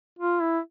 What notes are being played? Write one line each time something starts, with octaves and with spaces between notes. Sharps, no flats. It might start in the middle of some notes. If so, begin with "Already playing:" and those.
F4
E4